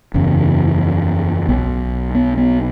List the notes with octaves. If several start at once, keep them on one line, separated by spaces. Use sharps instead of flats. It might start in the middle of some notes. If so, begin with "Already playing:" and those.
F#1 E2 C#3
B1 B2 B3
B3
B3